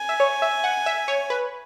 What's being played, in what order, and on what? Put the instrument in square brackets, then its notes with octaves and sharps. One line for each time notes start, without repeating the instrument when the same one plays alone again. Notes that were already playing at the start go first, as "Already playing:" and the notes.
Already playing: [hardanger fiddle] G#5
[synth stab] E5
C#5
E5
F#5
E5
C#5
B4